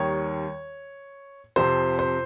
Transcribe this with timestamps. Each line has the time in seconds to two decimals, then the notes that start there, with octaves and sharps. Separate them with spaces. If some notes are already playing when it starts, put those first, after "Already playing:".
Already playing: D#2 D#3 G3 C#5
1.56 F2 C3 F3 C5
1.99 C5